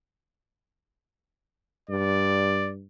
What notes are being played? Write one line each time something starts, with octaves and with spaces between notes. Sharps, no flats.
G2 D5